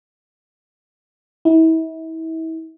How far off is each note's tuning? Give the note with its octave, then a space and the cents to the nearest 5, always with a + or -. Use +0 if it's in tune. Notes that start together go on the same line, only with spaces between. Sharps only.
E4 -35